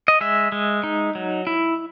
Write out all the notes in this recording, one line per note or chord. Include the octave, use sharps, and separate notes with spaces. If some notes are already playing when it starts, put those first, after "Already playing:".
D#5
G#3 E5
G#3
D#4
F#3
E4